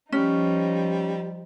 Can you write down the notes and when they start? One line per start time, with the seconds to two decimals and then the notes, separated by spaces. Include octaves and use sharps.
0.12 F3 G3 C#4 D#4